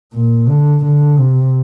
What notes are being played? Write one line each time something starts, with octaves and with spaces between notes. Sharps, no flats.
A#2
D3
D3
C3